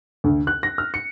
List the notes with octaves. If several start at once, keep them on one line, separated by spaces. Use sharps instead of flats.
D2
F#6
A#6
F6
C#7